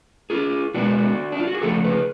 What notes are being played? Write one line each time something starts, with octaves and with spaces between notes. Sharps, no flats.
F4 G#4
B2 G#3 B3 D4 F#4
D4
F4
F#4
G#4
C#3 F3 A3 F#4 A4
G#4 B4